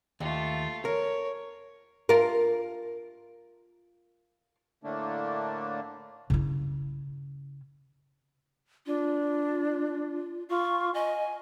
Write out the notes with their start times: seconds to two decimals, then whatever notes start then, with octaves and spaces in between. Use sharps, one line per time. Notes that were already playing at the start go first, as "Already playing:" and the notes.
0.20 D#2 A3 F4
0.85 A#4 C#5
2.09 F4 A#4
4.84 A2 D3 A3 A#3 D4
6.30 C#3 E4
8.86 D4 F4
10.50 F4 C#6
10.94 D#5 G#5